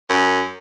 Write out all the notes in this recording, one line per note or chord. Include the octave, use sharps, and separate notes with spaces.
F#2